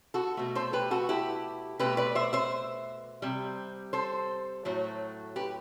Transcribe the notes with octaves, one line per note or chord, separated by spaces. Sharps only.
F#4 A4
B2 A3
A4 C5
G4 B4
F#4 A4
E4 G4
B2 A3 G4 B4
B4 D5
C5 E5
C5 E5
C3 G3
A4 C5
A2 F#3 A3
G4 B4